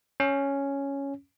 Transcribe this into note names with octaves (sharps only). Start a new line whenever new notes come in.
C#4